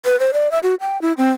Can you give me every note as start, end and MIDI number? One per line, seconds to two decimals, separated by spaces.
0.05 0.18 71
0.20 0.31 72
0.33 0.51 74
0.51 0.59 76
0.63 0.75 66
0.81 1.00 79
1.02 1.13 64
1.18 1.31 60